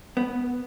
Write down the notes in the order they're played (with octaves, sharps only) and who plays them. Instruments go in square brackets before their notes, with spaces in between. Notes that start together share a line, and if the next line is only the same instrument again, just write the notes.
[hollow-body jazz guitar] B3